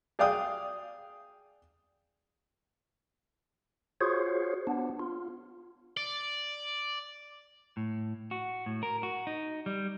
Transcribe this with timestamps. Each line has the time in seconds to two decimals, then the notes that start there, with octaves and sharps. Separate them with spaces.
0.19 G#4 D5 F5 G5 D#6
4.01 F4 F#4 G#4 C5 C#5
4.67 B3 D4
4.99 F4
5.97 D5
7.77 A2
8.31 F#4
8.66 A2
8.83 A#4
9.03 F#4
9.27 D#4
9.66 G3